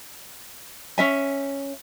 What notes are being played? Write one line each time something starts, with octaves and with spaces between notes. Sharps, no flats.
C#4 E5 G#5